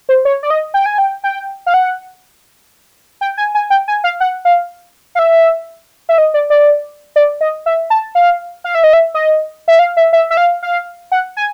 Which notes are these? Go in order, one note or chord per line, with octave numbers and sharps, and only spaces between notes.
C5
C#5
D5
D#5
G5
G#5
G5
G5
F5
F#5
G5
G#5
G#5
G5
G#5
F5
F#5
F5
F5
E5
E5
D#5
D5
D5
D5
D#5
E5
A5
F5
F5
E5
D#5
E5
D#5
E5
F5
E5
E5
E5
F5
F5
F#5
G#5